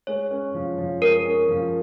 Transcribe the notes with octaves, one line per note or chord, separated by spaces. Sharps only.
G#3 C#5
C#4
F3
F3
G#3 A#4
C#4
F3